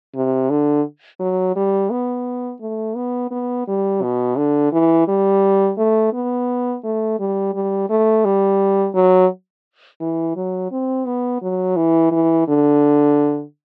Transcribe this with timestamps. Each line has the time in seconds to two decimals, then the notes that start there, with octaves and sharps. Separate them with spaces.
0.15 C3
0.50 D3
1.20 F#3
1.56 G3
1.90 B3
2.61 A3
2.96 B3
3.31 B3
3.67 G3
4.02 B2
4.37 D3
4.72 E3
5.08 G3
5.77 A3
6.13 B3
6.84 A3
7.20 G3
7.54 G3
7.90 A3
8.25 G3
8.95 F#3
10.00 E3
10.36 F#3
10.72 C4
11.06 B3
11.42 F#3
11.76 E3
12.11 E3
12.48 D3